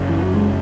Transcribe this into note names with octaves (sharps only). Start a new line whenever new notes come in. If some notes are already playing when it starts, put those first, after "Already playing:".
Already playing: F#1 F#2 C#3
E3
F#3
G#3